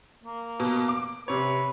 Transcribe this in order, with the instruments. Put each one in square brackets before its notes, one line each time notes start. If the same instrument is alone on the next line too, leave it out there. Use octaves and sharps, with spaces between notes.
[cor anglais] A#3
[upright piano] B2
D6
[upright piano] C3 C#5 [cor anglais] B4